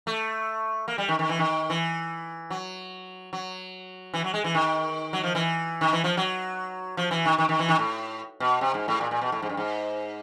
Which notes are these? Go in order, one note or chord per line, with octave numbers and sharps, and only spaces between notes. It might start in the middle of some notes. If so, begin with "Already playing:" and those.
A3
A#3
G3
D#3
D#3
E3
D#3
E3
F#3
F#3
E3
F#3
G#3
E3
D#3
F#3
F3
E3
D#3
E3
F3
F#3
F3
E3
D#3
D#3
D#3
E3
D#3
A2
B2
C3
G#2
A2
A#2
A#2
B2
A2
G#2
G2
G#2